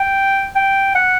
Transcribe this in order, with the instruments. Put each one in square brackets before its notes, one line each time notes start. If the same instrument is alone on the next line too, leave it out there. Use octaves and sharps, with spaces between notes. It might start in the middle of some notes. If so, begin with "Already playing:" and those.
Already playing: [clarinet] G5
G5
F#5